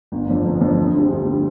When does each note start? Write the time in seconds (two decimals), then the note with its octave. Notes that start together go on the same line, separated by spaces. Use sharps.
0.12 G1
0.29 F2 F3 D4
0.45 G1
0.61 F2 F3 D4
0.78 D2
0.94 D3 G3
1.10 D2
1.26 D3 G3